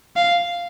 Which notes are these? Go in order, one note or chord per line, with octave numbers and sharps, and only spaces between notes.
F5